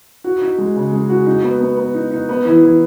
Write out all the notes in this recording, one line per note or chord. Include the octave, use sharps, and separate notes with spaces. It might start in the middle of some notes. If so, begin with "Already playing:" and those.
F#4
D#4
G#3
C#3
G#3
F#4
D#4
B3
B3
B3
D#4
D#4
B3
E3
E3